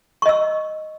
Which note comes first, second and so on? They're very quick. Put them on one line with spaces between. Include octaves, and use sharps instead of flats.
C#6 D#5 E6